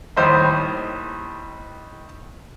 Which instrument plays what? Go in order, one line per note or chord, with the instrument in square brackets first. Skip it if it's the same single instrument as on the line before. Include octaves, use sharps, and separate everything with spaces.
[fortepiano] D#2 A2 G3 C5 D#5 B5